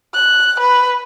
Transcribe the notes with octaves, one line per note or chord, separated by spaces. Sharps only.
F#6
B4